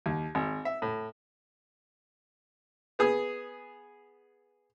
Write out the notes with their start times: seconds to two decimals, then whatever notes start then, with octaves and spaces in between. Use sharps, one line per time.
0.06 D#2
0.35 G#1
0.65 E5
0.82 A2
2.99 B3 G#4